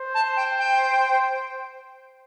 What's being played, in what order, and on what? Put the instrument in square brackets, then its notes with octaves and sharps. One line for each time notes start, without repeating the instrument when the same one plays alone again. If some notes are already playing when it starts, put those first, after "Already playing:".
Already playing: [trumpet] C5
[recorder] A5
G5
G5